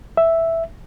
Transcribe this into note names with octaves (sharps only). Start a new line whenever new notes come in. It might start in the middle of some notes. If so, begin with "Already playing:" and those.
E5